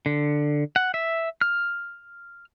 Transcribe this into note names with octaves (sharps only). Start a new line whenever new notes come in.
D3
F#5
E5
F6